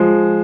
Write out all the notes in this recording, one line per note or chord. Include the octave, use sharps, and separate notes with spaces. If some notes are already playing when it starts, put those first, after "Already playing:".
Already playing: F3 G#3